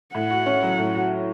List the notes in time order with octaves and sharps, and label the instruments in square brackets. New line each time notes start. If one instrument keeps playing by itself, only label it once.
[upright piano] A2 [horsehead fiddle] F#5
[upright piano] F#4
C#4
F#3
A2
F#4